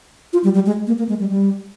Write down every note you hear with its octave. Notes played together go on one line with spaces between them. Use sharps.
F4
G3
G3
G#3
A#3
A#3
G#3
G3
G3